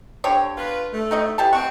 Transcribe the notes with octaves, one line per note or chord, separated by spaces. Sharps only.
D3 G4 C#5
F4 B4
A3
D#4 F#4 D#5
E3 G4 A5
C4 D#4 F#5 C#6